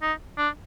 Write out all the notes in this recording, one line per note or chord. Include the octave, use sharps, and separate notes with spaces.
D#4
D4